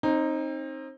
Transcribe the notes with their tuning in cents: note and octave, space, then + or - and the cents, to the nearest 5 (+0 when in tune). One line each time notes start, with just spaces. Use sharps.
C4 +30 D#4 +0